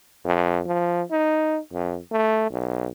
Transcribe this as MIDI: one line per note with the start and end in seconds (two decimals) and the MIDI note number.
0.25 0.60 41
0.66 1.02 53
1.11 1.59 63
1.72 1.98 41
2.12 2.49 57
2.51 2.88 35